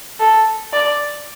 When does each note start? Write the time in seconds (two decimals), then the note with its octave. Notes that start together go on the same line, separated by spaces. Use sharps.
0.20 A4
0.73 D5